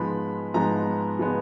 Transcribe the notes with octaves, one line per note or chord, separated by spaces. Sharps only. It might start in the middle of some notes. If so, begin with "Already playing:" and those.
Already playing: G#2 F3 G#3 B3 B5
G#2 F3 G#3 B3 A#5
F3 G#3 B3